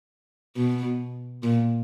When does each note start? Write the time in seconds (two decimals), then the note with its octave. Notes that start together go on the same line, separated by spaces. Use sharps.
0.56 B2
1.43 A#2